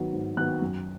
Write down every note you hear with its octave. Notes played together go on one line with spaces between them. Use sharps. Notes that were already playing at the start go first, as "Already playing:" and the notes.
Already playing: D#3 F#3 B3
G#2
D#3 F#3 B3 F#6
F#2